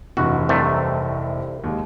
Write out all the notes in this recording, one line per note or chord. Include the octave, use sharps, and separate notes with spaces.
F1 G2 E3 F#4
C2 C3 A3
D#2 G#3